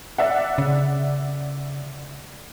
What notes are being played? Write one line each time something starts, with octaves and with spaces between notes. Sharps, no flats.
D5 E5 F#5
C#3